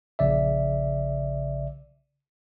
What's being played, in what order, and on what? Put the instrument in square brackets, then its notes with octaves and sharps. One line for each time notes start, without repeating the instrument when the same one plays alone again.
[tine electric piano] A#1 C#3 D5 E5